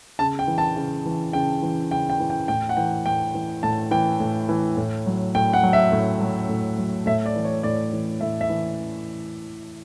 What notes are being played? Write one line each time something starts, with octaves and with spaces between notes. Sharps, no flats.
C#3 A5
G5
E3
A5
C#3
E3
C#3 G5
E3
C#3 G5
G5
E3
G5
A2 G5
F#5
E3 G5
A2 G5
E3
A2 A5
E3 G5
A2
E3
A2
F#3
A2 G5
F#5
F#3
E5
A2
F#3
A2
F#3
A2 E5
D5
E3
C#5
A2 D5
E3
A2 E5
E5
E3